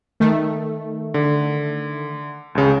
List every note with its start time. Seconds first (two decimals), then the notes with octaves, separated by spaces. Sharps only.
0.20 D#3 A3
1.14 D3
2.55 C#2 C#3